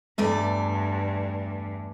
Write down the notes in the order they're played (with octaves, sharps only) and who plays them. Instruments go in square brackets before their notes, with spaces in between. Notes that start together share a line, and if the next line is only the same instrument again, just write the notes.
[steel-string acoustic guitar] E2 A3 D5 [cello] G2